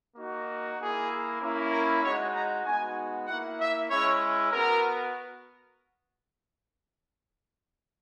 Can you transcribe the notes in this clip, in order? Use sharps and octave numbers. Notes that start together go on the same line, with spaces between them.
A#3 D#4 F#4
A#3 E4 G#4
A#3 C#4 E4
A#4
G#3 D#4 F#4 C#5
A#5
G#3 B3 D#4 F#4 G#5
A#3 E4 F#5
E5
G#3 C#4 E4 C#5
B3 F#4 A#4